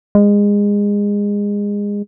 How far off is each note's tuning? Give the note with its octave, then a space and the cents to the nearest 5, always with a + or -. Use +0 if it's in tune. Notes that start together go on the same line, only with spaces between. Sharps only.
G#3 -25